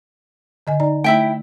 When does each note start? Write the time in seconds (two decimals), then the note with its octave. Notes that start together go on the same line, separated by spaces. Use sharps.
0.67 D3 D#5 G#5
0.80 D#4 D5 A#5
1.04 A3 E4 E5 G5